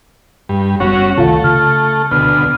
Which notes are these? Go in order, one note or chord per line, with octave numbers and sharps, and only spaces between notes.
G2
F#1 G3 B3 C#4 F#4
C#2 C3 D#3 A3 F4 F5
C#3 F6
D2 B2 F6